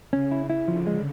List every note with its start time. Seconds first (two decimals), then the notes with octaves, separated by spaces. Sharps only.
0.13 C#3 C#4
0.31 E4
0.50 E4
0.68 D3 F3
0.87 G#3